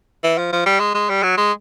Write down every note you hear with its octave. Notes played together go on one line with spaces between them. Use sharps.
E3
F3
F3
G3
G#3
G#3
G3
F#3
G#3